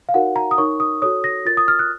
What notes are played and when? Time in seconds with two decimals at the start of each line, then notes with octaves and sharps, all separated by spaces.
0.09 F5
0.14 D#4 F#4 A#4 C#5 F#5
0.36 A#5
0.51 D#6
0.58 D#4 A#4 C#5 C#6
0.80 D#6
1.02 F#4 A4 C#5 D#6
1.24 A#6
1.45 F4 A#4 C#5 A6
1.57 D#6
1.68 F6
1.79 F#6